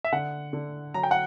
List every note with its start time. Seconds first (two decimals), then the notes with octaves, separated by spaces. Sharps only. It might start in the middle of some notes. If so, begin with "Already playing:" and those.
0.04 E5
0.12 D3 F#5
0.53 D3
0.94 F#3 A#5
1.03 G5
1.11 F#5